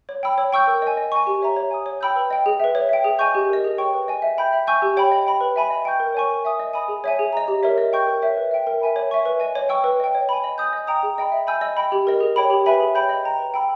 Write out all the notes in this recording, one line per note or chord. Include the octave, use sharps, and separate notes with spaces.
C#5
G5 B5 E6
C#5
G5 C#6 E6 G6
A#4
D#5 G#5
D#5
G#5 C#6
G4
C#5 E5 A#5
C#5
G#5 D#6
C#5
G5 B5 E6 G6
B4
D#5 G5
G#4
B4 E5
C#5
E5 G5
G#4
D#5 G#5 C#6 G6
G4
A#4 D#5
G#4
C#5 G5 C#6
B4
D#5 G#5
E5
G5 B5 G6
E5
G#5 C#6 E6 G6
G4
C#5 G5 B5
D#5
G5 B5
B4
E5 G#5 B5
D#5
G5 C#6 G6
A#4
C#5 G#5 C#6
A#4
E5 G#5 D#6
D#5
G#5 B5 D#6
G#4
C#5 E5 G#5
G#4
D#5 A#5
G4
A#4 C#5 E5
D#5
G5 C#6 G6
A#4
C#5 E5
B4
E5 G5
A#4
E5 G#5 B5
C#5
E5 G#5 C#6
B4
D#5 G#5
C#5
G5 C#6 E6
B4
D#5 G5
C#5
G#5 B5
D#5
G#5 D#6 G6
D#5
G5 A#5 D#6
G#4
D#5 G5 B5
E5
G#5 B5 E6 G6
D#5
G5 B5
G4
A#4 D#5
G#4
C#5 G5 B5
G4
B4 E5 G#5 B5
G#4
C#5 G5 B5 G6
D#5
G5 A#5
B4
G5 B5 E6